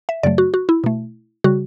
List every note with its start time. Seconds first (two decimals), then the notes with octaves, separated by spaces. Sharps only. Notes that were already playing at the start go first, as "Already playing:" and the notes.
0.09 E5
0.23 F#2 C#3 F#3 A3 D5
0.38 F#4
0.54 F#4
0.69 E4
0.84 B2 A3
1.44 C#3 G3 F#4